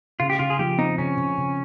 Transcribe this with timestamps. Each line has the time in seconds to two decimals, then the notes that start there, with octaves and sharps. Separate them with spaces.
0.19 C#3 F4
0.30 G4
0.39 C#3 F4
0.50 G#4
0.59 F3 G4
0.78 C4 D#4
0.98 C#3 C#4
1.17 C#3
1.37 C#3